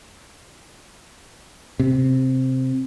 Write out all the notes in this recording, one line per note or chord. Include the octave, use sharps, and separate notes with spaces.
C3